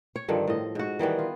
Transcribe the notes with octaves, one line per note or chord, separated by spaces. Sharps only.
C#5
G2 D3 D#3 F3
A2 D#5
G#2 F#4
D#3 E3 G3 B3
F4